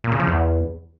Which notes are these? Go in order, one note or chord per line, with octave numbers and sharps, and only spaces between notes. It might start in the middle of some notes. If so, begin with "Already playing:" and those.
A#2
C#3
F3
E2